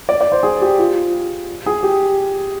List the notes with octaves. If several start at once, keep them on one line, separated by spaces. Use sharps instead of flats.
D5
D5
C5
G#4
G4
F4
G#4
G4